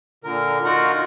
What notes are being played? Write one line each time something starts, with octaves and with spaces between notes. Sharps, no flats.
A#2 D3 A#4
D#4 F4 F#4 A#4 F#5